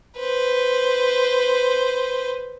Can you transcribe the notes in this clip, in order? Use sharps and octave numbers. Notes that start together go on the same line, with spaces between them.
B4 C5